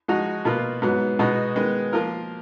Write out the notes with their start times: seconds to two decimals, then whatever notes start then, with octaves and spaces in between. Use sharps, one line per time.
0.08 F3 G#3 D#4 F#4
0.45 B2 A#3 F4 B4
0.82 G#2 F#3 B3
1.19 B2 G#3 B3 D#4 F#4
1.56 D#3 G#3 B3
1.93 F3 A#3 F4 A#4